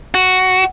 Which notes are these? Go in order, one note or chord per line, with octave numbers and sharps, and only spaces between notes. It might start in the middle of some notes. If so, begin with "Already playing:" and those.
F#4